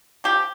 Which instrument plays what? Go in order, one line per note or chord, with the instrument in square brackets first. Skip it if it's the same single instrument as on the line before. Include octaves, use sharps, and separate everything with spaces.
[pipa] F3 G4